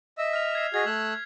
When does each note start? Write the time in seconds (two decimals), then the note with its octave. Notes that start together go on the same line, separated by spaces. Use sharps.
0.18 D#5 E5 E6
0.33 F6 F7
0.55 G#6 C7
0.74 F#4 G#4 D#5 G#6 B6
0.86 A3 E6 F#6